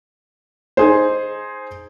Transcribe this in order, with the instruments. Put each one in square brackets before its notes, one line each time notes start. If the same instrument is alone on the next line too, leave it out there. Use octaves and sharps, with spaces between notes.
[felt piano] D#4 G#4 C5